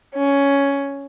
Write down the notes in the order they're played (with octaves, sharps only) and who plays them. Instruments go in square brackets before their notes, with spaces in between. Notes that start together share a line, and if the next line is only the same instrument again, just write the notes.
[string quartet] C#4